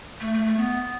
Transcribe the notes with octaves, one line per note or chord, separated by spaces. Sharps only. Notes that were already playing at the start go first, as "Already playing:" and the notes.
A3
A3
A3
B3